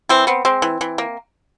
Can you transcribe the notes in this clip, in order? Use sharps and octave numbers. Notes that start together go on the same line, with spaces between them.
E3 C4
B3 C4
G#3 C4
E3
E3
A#3